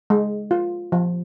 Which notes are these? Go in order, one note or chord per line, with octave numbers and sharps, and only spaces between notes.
G#3
F4
F3